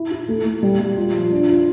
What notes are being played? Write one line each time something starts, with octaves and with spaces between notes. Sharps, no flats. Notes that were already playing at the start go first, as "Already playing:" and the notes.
Already playing: E4
E4
A3
A3
G3
G3
F4
F3
D4
F4